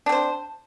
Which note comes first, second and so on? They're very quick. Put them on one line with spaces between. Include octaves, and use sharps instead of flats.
D4 C4 C5